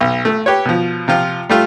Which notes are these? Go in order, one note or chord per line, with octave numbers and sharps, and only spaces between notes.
B1
A3
G4 B4 C#5
B2 F3
C3 F3 F4
G3 A3 F4